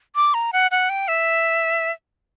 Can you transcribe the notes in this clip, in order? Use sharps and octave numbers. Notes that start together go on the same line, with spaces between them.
D6
A#5
F#5
F#5
G5
E5